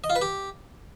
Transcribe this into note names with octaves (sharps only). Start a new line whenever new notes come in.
D#5
F4
B4
G4